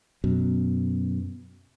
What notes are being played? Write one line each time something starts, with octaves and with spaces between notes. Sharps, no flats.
F#2 B2